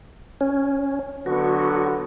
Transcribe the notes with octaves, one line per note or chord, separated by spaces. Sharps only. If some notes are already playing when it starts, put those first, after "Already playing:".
C#4
D3 F#3 B3 F#4